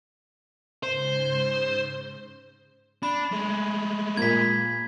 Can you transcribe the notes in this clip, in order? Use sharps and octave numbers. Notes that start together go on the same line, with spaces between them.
G#2 C#3 C5
D4 B5
G#3 A3
A#2 A#3 G#6 B6